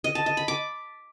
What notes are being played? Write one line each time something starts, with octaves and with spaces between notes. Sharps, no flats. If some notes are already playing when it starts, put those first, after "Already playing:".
D#5
A5
D#5
B5
D6